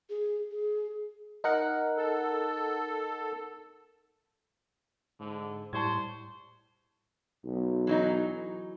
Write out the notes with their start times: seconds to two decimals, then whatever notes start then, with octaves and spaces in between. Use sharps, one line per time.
0.09 G#4
0.51 G#4
1.44 D#4 A#4 F#5
1.97 A4
5.20 G#2 D3
5.73 A2 G3 C5 A5 C#6 G#6
7.44 B1
7.87 E3 F#3 D#4